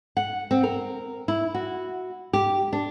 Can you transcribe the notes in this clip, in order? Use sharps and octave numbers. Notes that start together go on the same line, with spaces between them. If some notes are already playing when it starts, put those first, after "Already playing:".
F#5
C4
A#4
E4
F#4
G4
D4